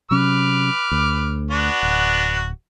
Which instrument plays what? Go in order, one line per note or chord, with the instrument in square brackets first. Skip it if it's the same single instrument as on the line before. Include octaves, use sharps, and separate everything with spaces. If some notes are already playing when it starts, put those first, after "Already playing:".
[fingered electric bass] C3 F#3 C#4 [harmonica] B4 D6 F6
[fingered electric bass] D2
[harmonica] B3 D4 F#4
[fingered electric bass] D1